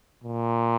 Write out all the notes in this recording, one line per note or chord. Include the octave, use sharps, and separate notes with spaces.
A#2